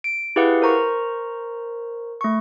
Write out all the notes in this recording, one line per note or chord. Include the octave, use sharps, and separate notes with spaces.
D7
E4 G4 G#4 B4 F5 F#5
A#4 C5 A#5 C#6
A3 C#6